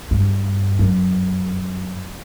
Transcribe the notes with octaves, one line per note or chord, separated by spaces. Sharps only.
G2
F#2